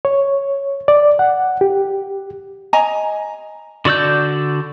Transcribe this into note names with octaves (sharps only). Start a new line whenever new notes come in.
C#5
D5
F#5
G4
D#5 G#5 A#5
D3 F#4 D5 E6 G6